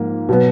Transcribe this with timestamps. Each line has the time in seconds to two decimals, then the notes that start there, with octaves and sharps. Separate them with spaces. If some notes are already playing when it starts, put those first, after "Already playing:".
Already playing: G#2 F3 A#3
0.29 B2 F#3 B3